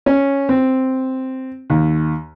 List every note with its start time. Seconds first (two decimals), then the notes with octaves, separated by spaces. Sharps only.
0.06 C#4
0.49 C4
1.70 D#2